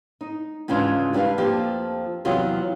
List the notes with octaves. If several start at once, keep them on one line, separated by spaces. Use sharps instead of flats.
D#4
G#2 C#3 E3 D4 F4
G3 D4 A#4 B4 F5
F2 F3 A#3 G4 A5
E2 C3 F#3 F4 D#5